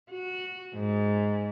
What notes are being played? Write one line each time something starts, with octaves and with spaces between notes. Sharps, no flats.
F#4
G#2